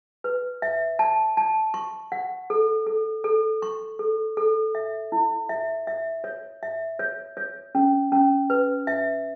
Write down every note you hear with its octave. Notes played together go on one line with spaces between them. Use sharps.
B4
E5
A5
A5
C#6
F#5
A4
A4
A4
C#6
A4
A4
E5
E4
E5
E5
C#5
E5
C#5
C#5
C#4
C#4
B4
E5